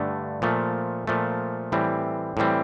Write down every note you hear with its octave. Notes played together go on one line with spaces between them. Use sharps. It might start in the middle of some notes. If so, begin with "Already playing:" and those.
Already playing: G2 D3 A3
A#2 F3 A3
A#2 F3 A3
A2 E3 G3 C4
A2 E3 G3 C4